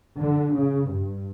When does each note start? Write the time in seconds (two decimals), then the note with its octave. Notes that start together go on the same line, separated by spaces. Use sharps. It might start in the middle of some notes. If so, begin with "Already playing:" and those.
0.19 D3
0.54 C#3
0.90 G2